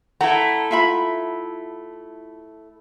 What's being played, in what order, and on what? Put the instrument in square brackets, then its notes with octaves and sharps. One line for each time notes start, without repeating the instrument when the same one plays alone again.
[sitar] A3 E4 [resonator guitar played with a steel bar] F#5 A#5
[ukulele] F4 E5 B5